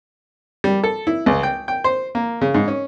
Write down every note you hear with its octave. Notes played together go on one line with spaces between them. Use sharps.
G3
A4
E4
C#2
G5
G5
C5
A#3
C#3
G#2
C#4